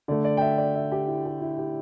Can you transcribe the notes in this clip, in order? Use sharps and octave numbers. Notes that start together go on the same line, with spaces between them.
D3 A3 D5
D5
G5
E5
D5
E5
G4
E4
G4
E4
G4